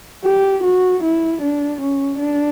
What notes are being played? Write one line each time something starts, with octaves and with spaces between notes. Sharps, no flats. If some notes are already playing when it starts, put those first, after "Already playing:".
G4
F#4
E4
D4
C#4
D4